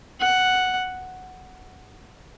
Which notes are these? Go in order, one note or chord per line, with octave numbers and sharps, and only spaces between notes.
F#5